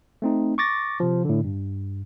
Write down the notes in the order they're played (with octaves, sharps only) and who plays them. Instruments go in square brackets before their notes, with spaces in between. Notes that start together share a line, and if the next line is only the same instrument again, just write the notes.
[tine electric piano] A3 C4 D#4
C#6 D6 A6 A#6
C3 F3
A2 D3
G2